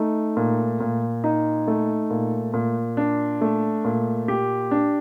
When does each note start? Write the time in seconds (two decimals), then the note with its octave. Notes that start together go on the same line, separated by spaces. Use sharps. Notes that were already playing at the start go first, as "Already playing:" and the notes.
Already playing: A3 D#4
0.37 A#2
0.80 A#2
1.24 D#4
1.68 A3
2.10 A#2
2.54 A#2
2.97 D4
3.41 A3
3.85 A#2
4.28 G4
4.71 D4